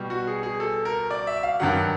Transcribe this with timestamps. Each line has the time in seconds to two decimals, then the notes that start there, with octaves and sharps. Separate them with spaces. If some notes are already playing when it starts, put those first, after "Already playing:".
Already playing: B2 G3
0.10 F#4
0.27 G#4
0.43 G#4
0.60 A4
0.85 A#4
1.11 D5
1.27 E5
1.43 F5
1.60 G2 D#3 F#3 F#5